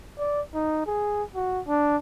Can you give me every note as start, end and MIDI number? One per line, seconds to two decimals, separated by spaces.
0.18 0.41 74
0.54 0.84 63
0.86 1.24 68
1.35 1.61 66
1.67 1.97 62